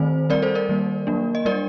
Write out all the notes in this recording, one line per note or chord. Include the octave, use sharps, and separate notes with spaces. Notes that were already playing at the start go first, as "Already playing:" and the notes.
Already playing: D#3 A3 C4 C5
G3 C4 A#4 D5
A4 C5
A#4 D5
D#3 G3 A#3
F#3 A#3 D4
D#5
G3 D4 A#4 D5